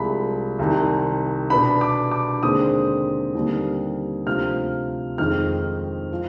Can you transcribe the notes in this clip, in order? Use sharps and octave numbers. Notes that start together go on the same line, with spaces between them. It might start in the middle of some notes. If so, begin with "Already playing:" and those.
Already playing: C2 C3 F3 G#3 B5
C2 C3 D#3
B2 B3 D4 B5
D6
D6
D#2 D3 G#3 C4 D#6
D#2 D3 G3 C4
D2 C3 F3 C4 F6
F2 D#3 G#3 C4 D#4 F6
F3